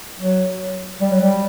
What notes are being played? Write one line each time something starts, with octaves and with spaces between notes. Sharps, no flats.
F#3
G3
F#3
G3